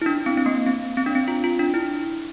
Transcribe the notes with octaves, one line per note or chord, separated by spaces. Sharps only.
E4
D4
C4
C4
A#3
C4
C4
D4
C4
F4
F4
D4
E4